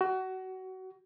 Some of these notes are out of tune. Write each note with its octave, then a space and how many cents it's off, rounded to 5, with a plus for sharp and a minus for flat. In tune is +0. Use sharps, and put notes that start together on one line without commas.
F#4 +25